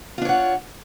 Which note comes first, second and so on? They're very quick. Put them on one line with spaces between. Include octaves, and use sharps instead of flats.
F4 D4 C#5 F#5